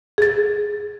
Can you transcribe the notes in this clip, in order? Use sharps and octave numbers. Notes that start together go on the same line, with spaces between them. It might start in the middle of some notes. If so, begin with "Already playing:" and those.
G#4 A6